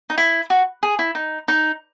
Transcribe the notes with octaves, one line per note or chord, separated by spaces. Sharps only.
D#4
E4
F#4
G#4
E4
D#4
D#4